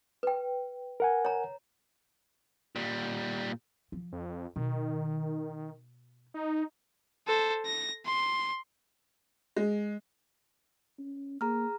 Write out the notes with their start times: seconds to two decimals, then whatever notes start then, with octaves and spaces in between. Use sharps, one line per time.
0.23 B4 G5
1.00 A#4 F#5 G#5
1.25 C#5 A#5
2.76 A#2 G3
3.92 F3
4.12 F2
4.56 B2 D#3
6.34 D#4
7.27 A4 C5
7.65 A#6
8.05 C6
9.56 G#3
10.99 C#4
11.41 A#3 G#4 A#5 F6